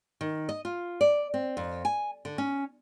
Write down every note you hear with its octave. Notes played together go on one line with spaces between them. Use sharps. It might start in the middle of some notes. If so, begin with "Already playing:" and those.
D#3
D#5
F4
D5
C4
F2
G#5
D3
C#4